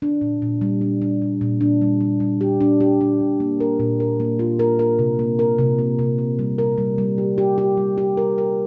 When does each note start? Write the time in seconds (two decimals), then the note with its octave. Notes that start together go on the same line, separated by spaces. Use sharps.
0.02 D4
0.21 A#2
0.42 A#2
0.61 G3
0.81 D4
1.02 D4
1.22 A#2
1.41 A#2
1.61 D4
1.82 G3
2.01 G3
2.20 G3
2.41 G4
2.61 D4
2.80 G4
3.01 D4
3.21 A#2
3.40 A#3
3.60 A#4
3.80 A#2
4.00 A#4
4.20 A#3
4.39 F4
4.59 A#4
4.79 A#4
4.99 C3
5.19 A#3
5.39 A#4
5.59 C3
5.79 A#3
5.99 C3
6.18 A#3
6.39 G3
6.58 A#4
6.78 G3
6.98 G3
7.18 G4
7.38 G4
7.58 G4
7.77 G3
7.98 G4
8.17 A#4
8.38 A#4